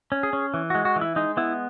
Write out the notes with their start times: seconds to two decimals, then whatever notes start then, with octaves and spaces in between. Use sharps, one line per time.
0.12 C#4
0.23 G#4
0.33 C#4
0.54 E3
0.70 G#3 F#4
0.85 F#4
0.96 E3
1.01 E4
1.16 G#3 D#4
1.37 B3 E4